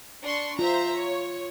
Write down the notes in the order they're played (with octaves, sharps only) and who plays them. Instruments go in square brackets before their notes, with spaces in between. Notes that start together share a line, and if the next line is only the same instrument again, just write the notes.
[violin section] D4 C6 C#6
[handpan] F4 [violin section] C5 E5 A#5
[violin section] C#5